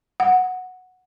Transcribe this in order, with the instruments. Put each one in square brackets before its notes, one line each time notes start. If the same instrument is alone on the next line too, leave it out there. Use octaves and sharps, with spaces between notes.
[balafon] F#5